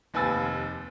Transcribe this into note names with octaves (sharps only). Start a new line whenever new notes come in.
F1 D#2 B4 G#5 E6 A6